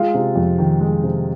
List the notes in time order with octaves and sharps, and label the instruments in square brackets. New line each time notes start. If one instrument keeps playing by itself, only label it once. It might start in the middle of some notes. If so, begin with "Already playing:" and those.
Already playing: [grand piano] G#3 F4
C3
F2
D#3
G#3
C3